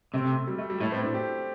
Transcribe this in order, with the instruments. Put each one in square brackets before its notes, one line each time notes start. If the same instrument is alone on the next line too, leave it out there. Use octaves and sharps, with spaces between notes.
[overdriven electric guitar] C3 [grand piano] A3
[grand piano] G3
A3
G3
[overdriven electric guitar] A2 [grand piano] A3
[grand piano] C4
D4
G4